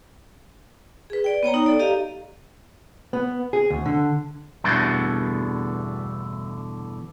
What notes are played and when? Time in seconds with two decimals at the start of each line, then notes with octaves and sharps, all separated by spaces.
1.10 G#4 B4
1.24 D5 G5
1.43 B3 C#5 G5 A#5
1.54 D#4
1.66 A4 D5
1.79 G4 D#5 F5 A#5
3.13 B3
3.53 G#4
3.70 D2
3.85 D3
4.64 E2 G2 B2 D3 A3